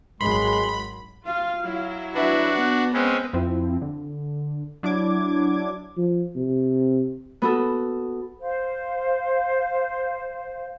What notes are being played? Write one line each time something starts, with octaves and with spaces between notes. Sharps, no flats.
G#1 F#3 G#3 B5 C6
F4 F5
F#3 E4
D4 F#4 B4 E5
B3 F#5
G#3 C4 C#4 B4
F2 F3 C4 E4
D3
F#3 D4 E4 D6 G#6
F3
C3
B3 F#4 A4
C5 F5